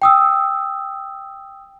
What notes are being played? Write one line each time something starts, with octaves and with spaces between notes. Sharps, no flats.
G5 D#6 E6